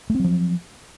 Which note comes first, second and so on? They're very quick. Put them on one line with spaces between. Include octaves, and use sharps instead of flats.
A3 C4 F#3 F3